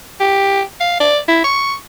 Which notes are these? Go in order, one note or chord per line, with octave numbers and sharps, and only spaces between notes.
G4
F5
D5
E4
C#6